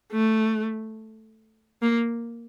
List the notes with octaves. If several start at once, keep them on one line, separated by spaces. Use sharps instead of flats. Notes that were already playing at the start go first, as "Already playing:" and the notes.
A3
A#3